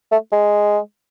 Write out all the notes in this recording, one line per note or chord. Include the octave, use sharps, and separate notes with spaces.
A3
G#3